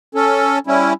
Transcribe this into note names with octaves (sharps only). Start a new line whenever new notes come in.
C#4 A4
G3 C#4 E4